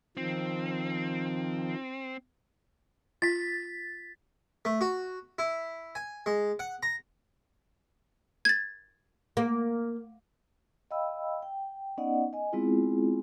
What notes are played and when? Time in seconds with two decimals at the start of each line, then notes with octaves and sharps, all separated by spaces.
0.17 D#3 F3 C4
3.22 F4 A6 B6
4.65 A3
4.81 F#4
5.39 E4
5.95 G#5
6.26 G#3
6.59 F#5
6.83 A#5
8.45 G#6 A6
9.37 A#3
10.91 D#5 F5 G5 B5 E6
11.42 G5
11.97 B3 C#4 D#4 D5 D#5 F#5
12.33 D#5 G#5
12.53 G#3 B3 C4 E4 F4 G#4